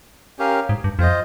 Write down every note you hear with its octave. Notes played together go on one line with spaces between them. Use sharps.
C#4 G4 A#4 F5
G#2
G2
F2 F4 C5 D#5